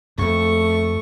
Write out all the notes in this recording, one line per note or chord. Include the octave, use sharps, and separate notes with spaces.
F2 A3 C#6